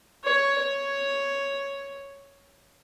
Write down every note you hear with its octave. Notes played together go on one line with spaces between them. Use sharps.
C#5
C#5